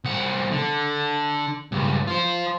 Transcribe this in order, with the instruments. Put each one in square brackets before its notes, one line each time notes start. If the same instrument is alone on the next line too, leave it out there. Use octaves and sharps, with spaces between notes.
[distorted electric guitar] C2 F#5
D3
C#2 G2
F4 C5